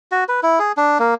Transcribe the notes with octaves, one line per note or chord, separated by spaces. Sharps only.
F#4
B4
E4
G#4
D4
A#3